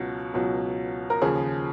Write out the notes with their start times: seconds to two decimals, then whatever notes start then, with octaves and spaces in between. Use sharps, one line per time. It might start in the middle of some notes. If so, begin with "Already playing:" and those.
Already playing: C#2 B2 F#3 F#4
0.34 C#2 B2 F#3
1.10 A#4
1.22 D#2 C#3 F3 G#4